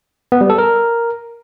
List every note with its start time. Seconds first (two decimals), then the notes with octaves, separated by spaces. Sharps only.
0.32 B3
0.41 G3
0.50 A4
0.58 A#4